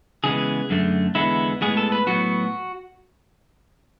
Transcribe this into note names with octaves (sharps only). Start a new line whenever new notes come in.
C#3 E3 G#3 B3 G#4
F#2 D3 A3
E2 D3 G#3 B3 E4
A2 G#3 B3 G#4
A4
B4
A2 F#3 B3 F#4